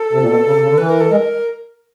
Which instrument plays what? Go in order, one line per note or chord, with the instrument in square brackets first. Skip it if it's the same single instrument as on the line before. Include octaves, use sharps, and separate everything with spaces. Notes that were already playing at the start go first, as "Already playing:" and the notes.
Already playing: [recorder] A4
[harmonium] C3
A#2
B2
C#3
C3
C#3
D3
[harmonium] E3 [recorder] B4
[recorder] A#4
A4
[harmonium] G#3 [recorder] A#4